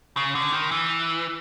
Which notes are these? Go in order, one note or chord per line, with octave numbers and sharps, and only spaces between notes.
C#3
D3
D#3
E3